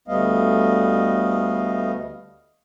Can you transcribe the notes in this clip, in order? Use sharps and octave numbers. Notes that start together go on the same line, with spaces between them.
D2 G3 A3 B3 D#5 F5